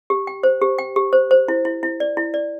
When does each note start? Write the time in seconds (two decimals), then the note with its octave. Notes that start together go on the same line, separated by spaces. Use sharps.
0.10 G4
0.27 G5
0.43 C5
0.62 G4
0.78 G5
0.96 G4
1.13 C5
1.31 C5
1.48 E4
1.65 E4
1.83 E4
2.00 D5
2.17 E4
2.34 D5